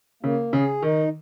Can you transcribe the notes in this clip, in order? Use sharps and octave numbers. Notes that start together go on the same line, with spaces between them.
C#3 A#3
C#3 G#4
D#3 D#4